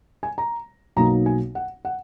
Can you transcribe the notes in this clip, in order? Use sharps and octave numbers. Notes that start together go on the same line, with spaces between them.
G#5
A#5
B1 B2 F#3 A#3 D#4 A#5
G#5
F#5
F#5